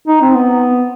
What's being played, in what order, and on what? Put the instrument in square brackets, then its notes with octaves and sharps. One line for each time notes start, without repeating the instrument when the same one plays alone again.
[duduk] D#4
C4
B3